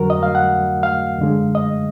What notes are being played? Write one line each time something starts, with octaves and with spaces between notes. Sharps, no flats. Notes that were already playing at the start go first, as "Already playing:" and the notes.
Already playing: F2 D3 F#3 F#4 A#4
D#5
F5
F#5
F5
F#2 D3 G#3
D#5